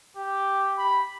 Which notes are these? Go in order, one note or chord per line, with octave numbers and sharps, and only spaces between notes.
G4
B5